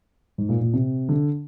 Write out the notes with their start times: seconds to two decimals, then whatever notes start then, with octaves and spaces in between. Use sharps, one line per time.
0.38 G#2
0.49 A#2
0.61 A#2
0.73 C3
1.09 D3